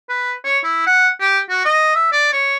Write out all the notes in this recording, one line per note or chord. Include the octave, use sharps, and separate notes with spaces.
B4
C#5
E4
F#5
G4
F#4
D#5
E5
D5
C#5